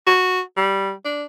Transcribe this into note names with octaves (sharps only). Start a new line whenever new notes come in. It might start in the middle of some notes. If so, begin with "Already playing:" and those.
F#4
G3
D4